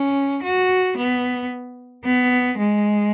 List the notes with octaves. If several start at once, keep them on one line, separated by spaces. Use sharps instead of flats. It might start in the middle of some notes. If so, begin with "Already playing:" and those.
Already playing: C#4
F#4
B3
B3
G#3